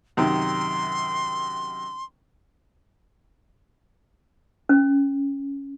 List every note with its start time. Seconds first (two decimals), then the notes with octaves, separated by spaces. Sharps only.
0.17 F#2 C3 D#3 C6
4.69 C#4